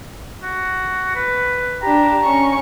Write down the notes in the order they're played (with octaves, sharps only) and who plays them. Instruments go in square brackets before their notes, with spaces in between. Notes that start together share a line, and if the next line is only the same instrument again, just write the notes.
[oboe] F#4
B4
[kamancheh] D4 G4 [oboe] A#5
[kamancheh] C#4 C#6